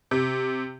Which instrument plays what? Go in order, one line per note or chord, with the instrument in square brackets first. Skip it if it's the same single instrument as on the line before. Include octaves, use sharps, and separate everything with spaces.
[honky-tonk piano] C3